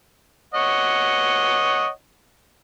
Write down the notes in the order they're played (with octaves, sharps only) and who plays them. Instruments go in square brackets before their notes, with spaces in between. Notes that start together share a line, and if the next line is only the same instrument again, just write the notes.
[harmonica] C#5 D#5 F#5